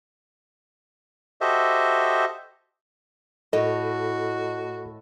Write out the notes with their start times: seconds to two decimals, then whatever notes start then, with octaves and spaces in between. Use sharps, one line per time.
1.41 F#4 G4 A4 C5 D#5 E5
3.53 A2 F#4 A4 D#5